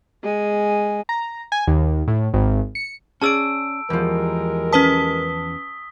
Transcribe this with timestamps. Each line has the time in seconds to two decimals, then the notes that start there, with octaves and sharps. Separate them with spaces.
0.23 G#3 G#5
1.09 A#5
1.52 G#5
1.67 D#2
2.08 A2
2.33 G#1
2.75 C#7
3.22 C#4 G#4 D5 A5 E6 D7
3.90 E2 F3 G#3 G4 A#4
4.73 C#4 B4 A5 D#6 B6 G7